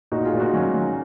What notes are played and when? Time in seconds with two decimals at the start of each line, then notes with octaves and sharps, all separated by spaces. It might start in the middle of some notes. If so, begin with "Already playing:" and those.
0.12 A#2 D#4 F#4
0.25 F4 G#4
0.33 A#2
0.40 D#4 F#4
0.53 F#3 C#4 F4
0.74 F#3